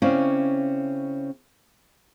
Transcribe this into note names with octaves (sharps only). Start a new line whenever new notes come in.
C#3 C4 C#4 E4 D5 F5